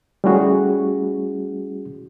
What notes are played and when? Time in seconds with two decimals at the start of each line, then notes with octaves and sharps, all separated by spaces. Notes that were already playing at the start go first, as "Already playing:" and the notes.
0.24 G3 A3 C#4 E4 F#4 G#4